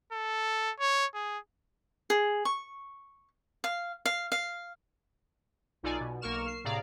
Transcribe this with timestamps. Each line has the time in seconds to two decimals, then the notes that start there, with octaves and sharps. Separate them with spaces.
0.12 A4
0.80 C#5
1.15 G#4
2.10 G#4
2.45 C#6
3.64 F5
4.06 F5
4.32 F5
5.83 B1 D#4 F4 A4 D5 G#5
6.00 B2
6.21 B1 A#3 A#4 C#6 F6 E7
6.47 C7
6.64 A2 C3 G#4 D5 F5 A#5